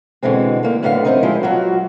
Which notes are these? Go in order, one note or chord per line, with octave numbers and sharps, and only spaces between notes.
B2 D3 E3 G#3 C4
D3 A#3 D#4
F#2 A2 D3 B3 G#4 F5
E2 A#2 C4 D#4 A#4 D#5
F3 G#3 E4 G4
F#3 F4 F#4